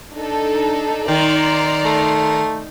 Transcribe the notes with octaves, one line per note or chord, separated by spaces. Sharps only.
D4 D#4 A4
D#3 D5 A#5 C6
A3